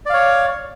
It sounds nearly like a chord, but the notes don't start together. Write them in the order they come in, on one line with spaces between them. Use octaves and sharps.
D5 F5 C#5